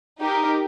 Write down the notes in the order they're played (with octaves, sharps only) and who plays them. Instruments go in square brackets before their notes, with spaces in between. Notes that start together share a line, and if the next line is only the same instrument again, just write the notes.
[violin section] D#4 G4 A#4